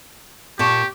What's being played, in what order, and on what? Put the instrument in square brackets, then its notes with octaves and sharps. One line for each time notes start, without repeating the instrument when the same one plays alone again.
[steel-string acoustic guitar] A#2 A5 [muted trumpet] G4 [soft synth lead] C#6